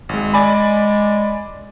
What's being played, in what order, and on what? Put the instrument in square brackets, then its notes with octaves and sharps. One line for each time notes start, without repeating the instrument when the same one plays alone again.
[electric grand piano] G#1 G#3
[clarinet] G#3 [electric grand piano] D5 G#5 B5